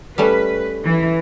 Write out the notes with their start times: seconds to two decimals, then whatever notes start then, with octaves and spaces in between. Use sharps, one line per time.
0.18 G3 A3 C#4 B4
0.84 E3